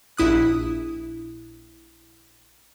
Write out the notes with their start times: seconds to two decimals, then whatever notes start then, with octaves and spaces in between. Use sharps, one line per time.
0.17 A#1 E4 D#6 F#6